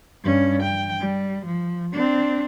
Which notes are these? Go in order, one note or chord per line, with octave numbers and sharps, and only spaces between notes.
G2 C#4
G5
G3
F3
C4 D4